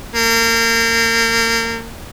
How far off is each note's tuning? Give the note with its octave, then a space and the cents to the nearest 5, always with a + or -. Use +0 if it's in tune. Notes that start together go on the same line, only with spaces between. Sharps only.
A#3 -30